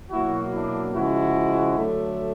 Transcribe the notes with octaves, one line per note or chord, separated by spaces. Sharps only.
B2 F#3 A#3 E4 F#4
D4 E4
C#3 F3 G#3 E4 F#4
D3 F#3 A3